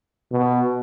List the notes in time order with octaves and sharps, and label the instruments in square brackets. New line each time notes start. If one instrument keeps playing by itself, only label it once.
[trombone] B2